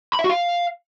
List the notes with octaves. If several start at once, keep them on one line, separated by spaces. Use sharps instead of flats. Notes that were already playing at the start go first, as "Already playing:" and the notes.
B5
E5
F#4
F5